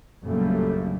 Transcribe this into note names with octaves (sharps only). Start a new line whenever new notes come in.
A#1 F#2 C#3 G3 A3 A#3